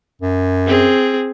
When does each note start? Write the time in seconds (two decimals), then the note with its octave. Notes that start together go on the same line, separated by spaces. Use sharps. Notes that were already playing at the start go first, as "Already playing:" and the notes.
0.22 F#2
0.67 C4 G#4